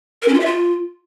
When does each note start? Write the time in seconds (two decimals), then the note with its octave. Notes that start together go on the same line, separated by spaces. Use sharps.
0.22 A#4
0.28 C#4
0.34 F4
0.40 E5
0.46 F4